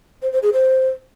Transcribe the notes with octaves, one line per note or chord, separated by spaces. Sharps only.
C5
C5
G#4
C5